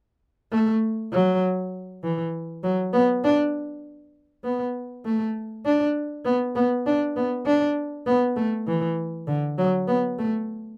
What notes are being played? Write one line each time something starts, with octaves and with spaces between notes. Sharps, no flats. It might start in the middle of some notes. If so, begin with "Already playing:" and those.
A3
F#3
E3
F#3
B3
D4
B3
A3
D4
B3
B3
D4
B3
D4
B3
A3
E3
D3
F#3
B3
A3